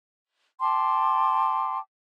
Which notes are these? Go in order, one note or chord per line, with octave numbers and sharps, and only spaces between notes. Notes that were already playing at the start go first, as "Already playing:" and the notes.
G5 A5 C6 D6